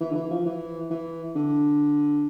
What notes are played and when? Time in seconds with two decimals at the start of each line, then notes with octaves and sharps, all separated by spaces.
0.01 E3
0.11 D3
0.15 E3
0.30 F3
0.46 E3
0.90 E3
1.35 D3